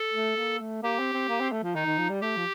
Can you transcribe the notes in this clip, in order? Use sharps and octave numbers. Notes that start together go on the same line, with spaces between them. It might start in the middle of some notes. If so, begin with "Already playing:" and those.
Already playing: A4
A3
A#3
A3
A#3 G4
C4
C4
A#3
C4
A3
F3
D#3 D#4
D#3
F3
G3
A3 G4
F3